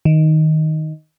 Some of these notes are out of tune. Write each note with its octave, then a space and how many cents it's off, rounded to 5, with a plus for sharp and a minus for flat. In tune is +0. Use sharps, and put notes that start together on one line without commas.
D#3 +5